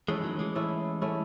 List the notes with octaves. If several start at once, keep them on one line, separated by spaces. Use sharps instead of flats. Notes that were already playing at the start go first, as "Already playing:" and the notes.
E3 G#3 A3 C#4 E4
D#3 F#3
E3 G#3
A3 C#4 E4
A3 C#4 E4